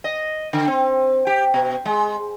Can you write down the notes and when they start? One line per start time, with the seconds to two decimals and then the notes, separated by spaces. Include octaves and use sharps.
0.04 D#5
0.53 D3
0.68 C4
1.27 G4
1.54 B2
1.85 G#3